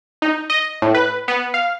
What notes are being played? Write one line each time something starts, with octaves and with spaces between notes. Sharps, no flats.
D#4
D#5
A2
B4
B3
F5